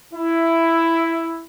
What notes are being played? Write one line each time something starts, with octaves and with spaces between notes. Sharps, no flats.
E4